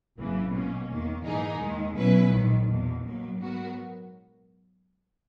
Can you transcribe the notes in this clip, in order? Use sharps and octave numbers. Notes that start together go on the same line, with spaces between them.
G#1 F#2 C#3 E3 A#3
B2 A#3 C#4
E2 D#3 A#3
G#2 E3 A#3 D#4 G#4
D#2 D#3 G#3
B2 F#3 C#4 E4 B4
A#1 G#2 D#3 F#3
E2 B2 A#3
B2 F#3 A#3
G#2 F#3 B3 F#4 A#4